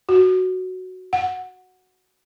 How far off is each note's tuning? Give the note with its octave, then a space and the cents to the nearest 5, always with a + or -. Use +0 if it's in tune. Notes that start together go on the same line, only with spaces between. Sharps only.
F#4 +0
F#5 -10